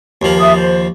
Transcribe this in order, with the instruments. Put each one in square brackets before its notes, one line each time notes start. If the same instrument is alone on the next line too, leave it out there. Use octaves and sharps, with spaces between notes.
[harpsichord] D#2 F3 [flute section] A#4
[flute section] E5 D#6
C5